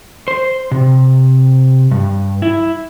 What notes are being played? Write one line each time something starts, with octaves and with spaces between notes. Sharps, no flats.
C5
C3
G2
E4